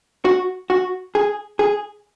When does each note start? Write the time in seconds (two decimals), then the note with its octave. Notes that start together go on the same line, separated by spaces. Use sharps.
0.25 F#4
0.70 F#4
1.15 G#4
1.59 G#4